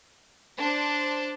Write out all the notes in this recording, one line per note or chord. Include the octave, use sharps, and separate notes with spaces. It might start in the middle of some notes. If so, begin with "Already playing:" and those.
D4 C5